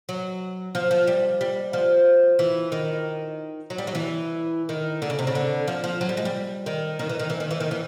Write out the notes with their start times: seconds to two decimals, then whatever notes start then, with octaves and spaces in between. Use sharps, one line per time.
0.09 F#3
0.75 F3
0.91 F3
1.07 G3
1.41 G3
1.73 F3
2.39 E3
2.72 D#3
3.70 F#3
3.78 G3
3.87 F#3
3.95 E3
4.69 D#3
5.02 D3
5.10 C#3
5.19 C3
5.27 C#3
5.35 D3
5.68 F3
5.84 F3
6.01 F#3
6.09 G3
6.17 G#3
6.25 G3
6.66 D#3
6.99 D#3
7.09 E3
7.19 D#3
7.30 E3
7.40 D#3
7.51 E3
7.60 D#3
7.71 E3